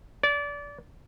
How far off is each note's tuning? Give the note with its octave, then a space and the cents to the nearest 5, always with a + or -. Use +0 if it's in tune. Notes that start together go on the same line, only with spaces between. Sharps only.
D5 -25